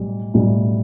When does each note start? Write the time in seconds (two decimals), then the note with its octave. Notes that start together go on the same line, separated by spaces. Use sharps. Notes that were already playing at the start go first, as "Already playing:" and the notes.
Already playing: B1 A2 G3
0.34 B1 A2 G3